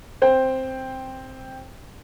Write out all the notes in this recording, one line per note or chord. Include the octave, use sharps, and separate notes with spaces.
C4 C5 G5